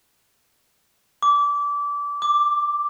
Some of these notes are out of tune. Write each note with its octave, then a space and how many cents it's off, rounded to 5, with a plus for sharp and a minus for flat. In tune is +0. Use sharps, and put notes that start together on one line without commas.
D6 -20
D6 +5